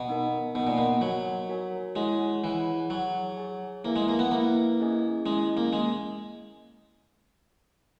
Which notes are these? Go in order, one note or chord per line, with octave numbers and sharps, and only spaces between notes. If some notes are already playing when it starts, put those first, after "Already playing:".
Already playing: B2
B3 D#4 A#4
B2 B3 D#4 A#4
A#2
B2
F#3 F#4 A#4 C#5 G#5
F#4 A#4 C#5 G#5
G#3 E4 G#4 C#5 F#5
E3 E4 G#4 C#5 F#5
F#3 G#4 C#5 G#5
G#4 C#5 G#5
A#3 E4 B4 E5 G#5
G#3
A#3
B3
A#3 E4 B4 E5 G#5
C#4 E4 G#4 D#5 G#5
G#3 C#4 E4 G#4 D#5 G#5
A#3
G#3